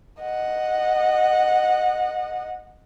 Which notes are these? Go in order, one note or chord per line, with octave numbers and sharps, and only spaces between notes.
D#5 F#5